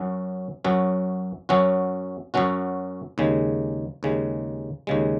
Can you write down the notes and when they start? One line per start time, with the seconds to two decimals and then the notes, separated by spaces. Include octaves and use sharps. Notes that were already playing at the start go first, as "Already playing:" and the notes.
Already playing: F#2 F#3 C#4 F#4
0.64 F#2 F#3 C#4 F#4
1.49 F#2 F#3 C#4 F#4
2.34 F#2 F#3 C#4 F#4
3.18 D#2 C#3 G#3
4.03 D#2 C#3 G#3
4.87 D#2 C#3 G#3